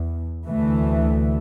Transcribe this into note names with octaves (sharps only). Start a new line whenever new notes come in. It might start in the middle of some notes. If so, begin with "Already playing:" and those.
Already playing: E2
D2 E3 A3